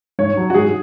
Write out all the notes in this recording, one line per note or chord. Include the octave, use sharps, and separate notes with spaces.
G#2 C#5
F#3
F#4
G#2 G#4